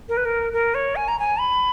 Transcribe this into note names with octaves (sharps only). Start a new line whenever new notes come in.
A#4
B4
A#4
A#4
C#5
G#5
A#5
G#5
B5